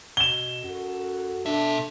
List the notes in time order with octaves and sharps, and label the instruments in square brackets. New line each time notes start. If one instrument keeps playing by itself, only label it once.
[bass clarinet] B2 [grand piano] E7 G7
[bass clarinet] F#2 [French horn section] F#4 A4
[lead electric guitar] B2 E5 [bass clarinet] D4 [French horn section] A4